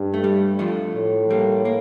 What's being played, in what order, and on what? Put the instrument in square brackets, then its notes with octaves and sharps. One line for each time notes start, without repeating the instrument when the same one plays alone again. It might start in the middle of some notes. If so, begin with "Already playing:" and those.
Already playing: [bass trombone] G2
[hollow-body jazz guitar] A3
G3
F3 A3
[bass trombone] A2
[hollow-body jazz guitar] G3 A#3
A#3